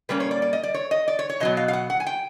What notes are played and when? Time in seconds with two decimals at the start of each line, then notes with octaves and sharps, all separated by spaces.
0.09 A#2 G3 A#3 C#4 B4
0.20 C#5
0.31 D5
0.42 D5
0.53 D#5
0.63 D5
0.74 C#5
0.91 D#5
1.08 D5
1.19 C#5
1.30 C#5
1.40 B2 F#3 B3 D#5
1.57 F5
1.68 F5
1.73 F#5
1.90 F#5
2.00 G#5
2.07 G5